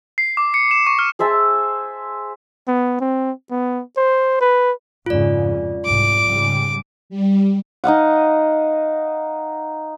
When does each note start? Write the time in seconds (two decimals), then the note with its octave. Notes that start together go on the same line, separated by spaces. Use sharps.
0.18 C7
0.37 D6
0.54 C#7
0.71 E7
0.87 C#6
0.99 F6
1.19 G#4 C5 E5 A5
2.68 B3
3.01 C4
3.51 B3
3.97 C5
4.41 B4
5.06 F2 G#2 C#3 F4 D5
5.85 C2 G#2 D6
6.28 G#2 C#3 G3
7.10 G3
7.84 D#4 D#5 F5 F#5